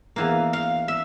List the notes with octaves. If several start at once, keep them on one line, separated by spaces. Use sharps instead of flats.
E2 E3 A#3 F5
F5
E5